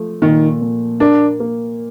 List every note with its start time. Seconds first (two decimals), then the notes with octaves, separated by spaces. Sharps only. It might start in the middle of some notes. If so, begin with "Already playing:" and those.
Already playing: F3 A3
0.22 A#2 D#3
0.61 A#2
1.00 A#3 D4
1.40 A#3